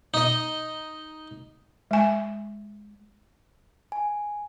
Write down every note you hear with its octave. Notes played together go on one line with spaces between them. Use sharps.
D#4 D#5
G#3 G#5
G#5